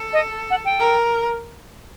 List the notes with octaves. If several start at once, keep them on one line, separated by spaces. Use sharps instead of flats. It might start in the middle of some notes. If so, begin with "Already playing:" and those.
Already playing: A4
D#5
F#5
G5
A#4